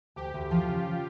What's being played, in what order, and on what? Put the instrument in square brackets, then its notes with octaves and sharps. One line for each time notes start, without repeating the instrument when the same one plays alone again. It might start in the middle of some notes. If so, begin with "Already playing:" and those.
[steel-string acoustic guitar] D2 [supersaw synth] G4
[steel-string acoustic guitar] D2
[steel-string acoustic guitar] F3 [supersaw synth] F4
[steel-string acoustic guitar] C#3